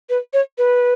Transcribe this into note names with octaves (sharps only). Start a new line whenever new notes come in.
B4
C#5
B4